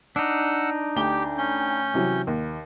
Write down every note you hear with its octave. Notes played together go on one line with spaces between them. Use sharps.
D4 D#4 F#5 E6
D2 G4 G5 G7
C#4 G6
C3 E3 F#3
D#2